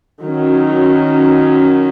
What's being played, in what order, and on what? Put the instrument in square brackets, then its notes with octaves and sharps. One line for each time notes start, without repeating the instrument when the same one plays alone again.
[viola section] D#3 F#3 C#4